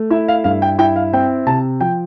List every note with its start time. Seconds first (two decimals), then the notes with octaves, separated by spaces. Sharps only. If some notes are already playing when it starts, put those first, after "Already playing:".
Already playing: A3
0.10 E4 E5
0.28 F5
0.44 G2 F5
0.62 G5
0.79 E4 G5
0.96 F5
1.13 C4 G5
1.46 C3 A5
1.81 F3 G5